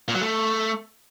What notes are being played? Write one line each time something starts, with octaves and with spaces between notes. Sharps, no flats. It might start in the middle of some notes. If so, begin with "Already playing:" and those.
A#2
F#3
A3